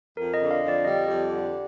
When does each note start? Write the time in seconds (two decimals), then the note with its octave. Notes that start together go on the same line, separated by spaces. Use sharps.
0.17 F2 A#4
0.34 D#5
0.40 D3
0.51 F5
0.63 F2
0.68 D5
0.84 G3 D#5
1.07 F2 G4
1.30 D3 G4